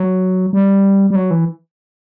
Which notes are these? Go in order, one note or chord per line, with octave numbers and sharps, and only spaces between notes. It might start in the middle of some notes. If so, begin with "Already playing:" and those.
Already playing: F#3
G3
G3
F#3
E3